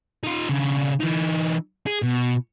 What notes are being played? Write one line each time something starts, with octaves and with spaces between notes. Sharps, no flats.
D#4 F4
C#3 D4
E3 D#4
G#4
B2